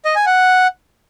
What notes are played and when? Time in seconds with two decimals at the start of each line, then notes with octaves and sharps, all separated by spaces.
0.05 D#5
0.16 G#5
0.26 F#5